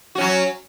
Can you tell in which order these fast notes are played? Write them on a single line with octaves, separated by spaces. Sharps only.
F#4 C#4 F#3